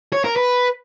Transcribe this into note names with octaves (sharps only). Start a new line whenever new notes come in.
C#5
A#4
B4